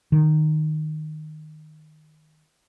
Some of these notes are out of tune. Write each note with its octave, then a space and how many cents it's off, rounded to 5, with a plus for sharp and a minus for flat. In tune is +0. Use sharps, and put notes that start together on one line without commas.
D#3 -10